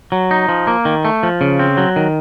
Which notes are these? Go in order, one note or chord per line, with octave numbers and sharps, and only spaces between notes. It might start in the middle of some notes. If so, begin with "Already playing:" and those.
F#3
D#4
F3
A#3
D#3
A3
F3
C#3
C4
F#3
D#3